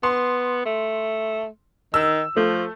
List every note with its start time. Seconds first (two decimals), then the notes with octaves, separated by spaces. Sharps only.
0.03 B3 C6
0.65 A3
1.94 D#3 E6
2.36 F3 A3